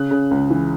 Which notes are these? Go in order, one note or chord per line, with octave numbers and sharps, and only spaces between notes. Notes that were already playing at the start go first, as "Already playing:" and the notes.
Already playing: C#3 F#6
C#3
C#2
E3